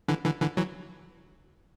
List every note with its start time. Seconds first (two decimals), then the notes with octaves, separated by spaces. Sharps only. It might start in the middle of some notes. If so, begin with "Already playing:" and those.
0.08 D3 E3
0.25 D3 E3
0.41 D3 E3
0.57 E3 F#3